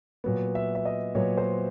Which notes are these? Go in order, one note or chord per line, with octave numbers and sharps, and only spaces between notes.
A#2 F#3 B3
E5
E5
D#5
A#2 F#3 B3 C#5
C5